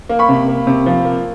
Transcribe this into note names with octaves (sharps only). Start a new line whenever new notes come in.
A#3
B5 C#6
C3
A#3
C3
F3
A#3